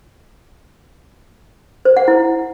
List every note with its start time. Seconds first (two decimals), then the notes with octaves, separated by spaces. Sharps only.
1.85 C5
1.97 F#5
2.08 E4